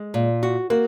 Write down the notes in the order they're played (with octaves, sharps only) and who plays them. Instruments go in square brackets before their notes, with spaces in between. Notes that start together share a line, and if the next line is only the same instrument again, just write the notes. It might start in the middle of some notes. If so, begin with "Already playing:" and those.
Already playing: [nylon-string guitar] G#3
A#2
F#4
[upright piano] A#3 [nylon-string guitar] F#4